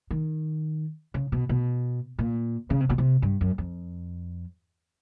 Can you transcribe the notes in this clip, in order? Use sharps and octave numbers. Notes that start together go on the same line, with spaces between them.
D#3
C#3
B2
B2
A#2
C#3
C3
B2
C3
G2
F#2
F2